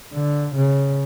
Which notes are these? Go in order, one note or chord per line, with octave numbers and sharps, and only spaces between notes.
D3
C#3